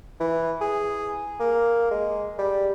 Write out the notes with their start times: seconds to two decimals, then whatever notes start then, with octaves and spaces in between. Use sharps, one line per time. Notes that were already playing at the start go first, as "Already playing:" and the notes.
0.20 E3
0.61 G#4
1.40 A#3
1.91 G#3
2.39 G3